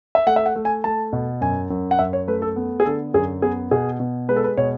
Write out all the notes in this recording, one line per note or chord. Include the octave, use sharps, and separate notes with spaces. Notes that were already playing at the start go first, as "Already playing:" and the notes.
E5
A3 F#5
E5
F#5
A3
G#5
A3 A5
B2
F#2 G#5
F#2
F#5
F#2 E5
C#5
A3 B4
A4
B3
G#4
D3 A4
F#2 G#4
B3 G#4
B2 G#4
B2
G#3 B4
A4
B4
B2 C#5